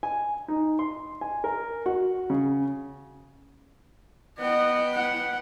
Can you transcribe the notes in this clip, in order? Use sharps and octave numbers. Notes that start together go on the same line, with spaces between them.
G#5
D#4
C6
G#5
A#4
F#4
C#3
B3 D#5 F#5 G5
F#5